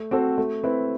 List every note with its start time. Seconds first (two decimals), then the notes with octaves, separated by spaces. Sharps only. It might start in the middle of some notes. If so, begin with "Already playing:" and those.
Already playing: A3
0.11 C4 F#4 A4 C5
0.38 A3
0.64 C4 E4 B4